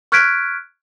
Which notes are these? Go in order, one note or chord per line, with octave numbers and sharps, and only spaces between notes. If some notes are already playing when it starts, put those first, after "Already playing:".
C#6 F6 F#6 G#6 B6 D7